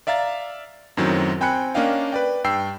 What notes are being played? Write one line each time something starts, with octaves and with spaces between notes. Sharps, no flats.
D5 E5 F5 A#5 A6
F#2 A2 D#3 F#3 C4
C4 G5 G#5 B5 F#6 C#7
A#3 C#4 D4 D#5 F5 G5
B4 D5 G5
G2 G5 E6 C7